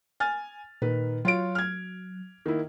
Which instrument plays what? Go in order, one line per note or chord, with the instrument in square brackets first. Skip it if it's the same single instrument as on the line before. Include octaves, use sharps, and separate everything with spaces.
[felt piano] G#5 F6 A6
[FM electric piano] A#2 [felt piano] D#3 B4
[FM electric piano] F#3 [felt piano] F4 C#5 D7
[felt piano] F6 G#6
D#3 A#3 E4